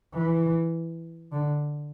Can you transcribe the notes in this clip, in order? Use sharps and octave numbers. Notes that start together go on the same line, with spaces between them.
E3
D3